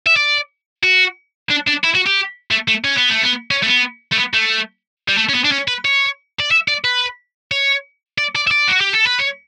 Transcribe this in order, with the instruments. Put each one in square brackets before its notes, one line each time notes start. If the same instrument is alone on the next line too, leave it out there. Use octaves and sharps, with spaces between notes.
[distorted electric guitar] E5
D5
F#4
D4
D4
E4
F#4
G4
A3
A3
C#4
B3
A3
B3
C#4
A3
B3
A3
B3
A3
G3
A3
C#4
B3
D4
C#4
B4
C#5
D5
E5
D5
B4
C#5
D5
D5
E5
D5
F#4
G4
A4
B4
C#5